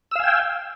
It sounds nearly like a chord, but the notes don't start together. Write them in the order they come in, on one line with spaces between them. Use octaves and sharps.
E6 F5 G#5 G5